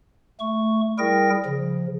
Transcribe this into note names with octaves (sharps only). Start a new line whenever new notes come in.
A3 C#6
G3 E4 G#4 A#4 G5 A#6
C#3 F3